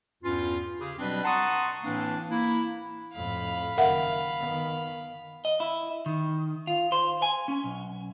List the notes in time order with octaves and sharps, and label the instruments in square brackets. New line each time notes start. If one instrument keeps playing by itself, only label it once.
[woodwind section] E2 G2 C#4 F4
C#3 G4 G#4
B2 F#3 G3 C4 D4 B4
F#5 A5 A#5 C6 C#6 D#6
A2 E3 A#3 C4 D4
A#3 E4
[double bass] F2 A2 [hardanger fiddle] F5 B5
[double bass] F#1 D#3 [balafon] A#4 E5 F#5
[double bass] D#3 B3
[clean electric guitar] D#5
E4
D#3
F4
C5
G#5
C#4
B1